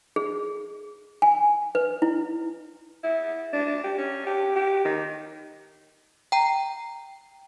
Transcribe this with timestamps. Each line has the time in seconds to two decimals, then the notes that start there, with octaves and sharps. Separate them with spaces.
0.16 G#4
1.22 G#5
1.75 B4
2.02 E4
3.04 E4
3.53 D4
3.84 G4
3.98 C#4
4.26 G4
4.56 G4
4.85 D#3
6.32 G5 A#5